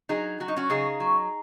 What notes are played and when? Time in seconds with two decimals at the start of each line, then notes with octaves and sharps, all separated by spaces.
0.09 F#3 D#4 G#4
0.40 F#3 F#4
0.48 D#4
0.56 C#4 F#4
0.70 C#3 D#4 G#4
1.00 F#3